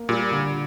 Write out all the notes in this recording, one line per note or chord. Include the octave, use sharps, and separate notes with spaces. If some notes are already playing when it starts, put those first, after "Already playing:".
Already playing: A#3
A#2 G3
D3